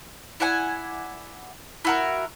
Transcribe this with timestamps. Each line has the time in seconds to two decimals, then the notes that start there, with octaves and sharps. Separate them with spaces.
0.40 E4 D5 F#5 G#5
1.85 E4 F#4 A#4